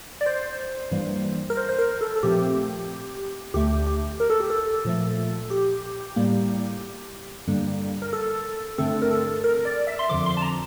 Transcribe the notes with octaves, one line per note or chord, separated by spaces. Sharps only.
D5
C5
G2 E3 G3 A#3
A#4
C5
C5
A#4
A4
A4
A#2 F3 A3 C4 G4
D2 D3 A3 G4
G4
A#4
A4
G4
A4
A#2 F3 A3
G4
A2 G3 A#3
G2 D3 G3 A#3
A#4
A4
G2 D3 A3 C4 A4
A#4
A4
A#4
D5
E5
C6
F2 D3 F3 D6
C6
A5
A#5